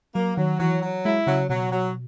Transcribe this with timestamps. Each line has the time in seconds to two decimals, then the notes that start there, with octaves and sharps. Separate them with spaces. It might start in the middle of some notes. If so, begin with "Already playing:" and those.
0.15 F#3 A#3
0.37 D#3 F#3
0.60 E3 F#3
0.82 F#3
1.05 G#3 E4
1.27 C#3 F#3
1.49 B2 F#3
1.72 F#3